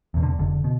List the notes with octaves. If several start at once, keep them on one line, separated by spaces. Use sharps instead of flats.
E2 B2
D3
F1 D3
B2